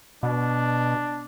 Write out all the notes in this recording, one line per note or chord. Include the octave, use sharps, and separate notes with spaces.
B2 D4